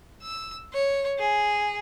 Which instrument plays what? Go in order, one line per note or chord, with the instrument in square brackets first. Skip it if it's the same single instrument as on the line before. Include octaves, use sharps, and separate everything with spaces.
[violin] E6
C#5
G#4